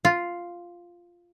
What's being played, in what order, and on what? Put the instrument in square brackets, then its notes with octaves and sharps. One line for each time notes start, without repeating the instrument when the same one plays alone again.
[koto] F4